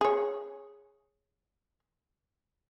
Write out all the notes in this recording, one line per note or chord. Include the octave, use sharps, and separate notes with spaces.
G#4 C#5